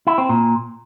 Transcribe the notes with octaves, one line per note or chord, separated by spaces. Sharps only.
E4
C4
A#2